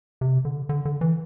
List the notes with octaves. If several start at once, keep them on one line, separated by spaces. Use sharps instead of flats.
C3
D3
D3
D3
E3